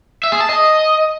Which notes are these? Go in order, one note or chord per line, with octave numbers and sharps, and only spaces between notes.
E5
G#4
A5
D#5